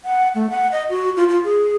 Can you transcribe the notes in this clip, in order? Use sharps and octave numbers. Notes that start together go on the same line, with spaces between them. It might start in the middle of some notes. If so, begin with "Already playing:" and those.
F#5
A3
F#5
D#5
F#4
F4
F4
G#4